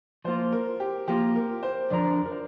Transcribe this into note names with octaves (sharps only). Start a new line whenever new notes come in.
F3 A#3 F4 C5
A#4
G4
F3 A#3 F4 G4
A#4
C5
F2 D3 F3 D4 A#4 D5
A#4
C5